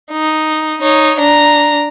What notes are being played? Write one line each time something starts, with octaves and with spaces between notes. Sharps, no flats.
D#4
D#4 C#5
D4 A#5